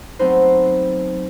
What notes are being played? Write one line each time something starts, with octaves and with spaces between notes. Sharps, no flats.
F#3 A3 B3 C4 D#4 C5